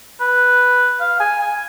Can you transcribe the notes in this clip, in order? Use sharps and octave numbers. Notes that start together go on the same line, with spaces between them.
B4
F5
G#5
G#5